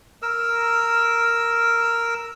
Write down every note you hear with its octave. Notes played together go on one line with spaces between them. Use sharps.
A#4 E6